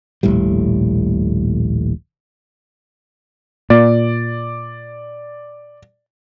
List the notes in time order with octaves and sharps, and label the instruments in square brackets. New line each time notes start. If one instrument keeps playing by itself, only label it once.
[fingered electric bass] D#1 A#1 A2 G3
[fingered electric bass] A#2 [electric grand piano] D5